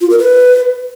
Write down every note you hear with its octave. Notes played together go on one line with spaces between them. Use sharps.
F4
A#4
B4